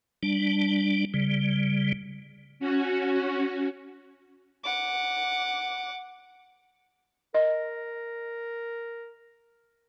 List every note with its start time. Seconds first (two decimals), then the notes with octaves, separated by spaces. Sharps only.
0.23 G3 D4
1.14 C#3 G3
2.60 C#4 F#4
4.64 F#5 D6
7.34 A#4 D#5